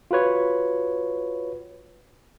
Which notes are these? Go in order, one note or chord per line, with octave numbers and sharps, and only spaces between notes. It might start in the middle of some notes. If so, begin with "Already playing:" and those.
F4 F#4 B4 C#5